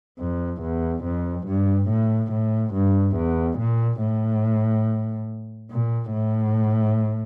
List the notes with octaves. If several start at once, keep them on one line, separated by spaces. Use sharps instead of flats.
F2
E2
F2
G2
A2
A2
G2
E2
A#2
A2
A#2
A2